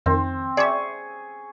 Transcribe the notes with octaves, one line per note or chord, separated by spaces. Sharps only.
F2 D#3 C4
G#4 D5 E5 C#6